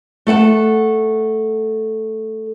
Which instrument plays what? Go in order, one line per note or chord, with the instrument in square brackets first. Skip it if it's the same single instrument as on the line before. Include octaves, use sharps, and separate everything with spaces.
[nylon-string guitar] A3 A4 F#5 A5